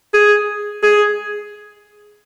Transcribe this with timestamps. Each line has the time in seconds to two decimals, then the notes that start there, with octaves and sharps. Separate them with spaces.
0.14 G#4
0.83 G#4